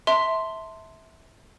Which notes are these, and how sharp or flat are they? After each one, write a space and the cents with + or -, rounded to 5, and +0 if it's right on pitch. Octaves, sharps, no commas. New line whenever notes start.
E5 -20 A5 +30 C6 +0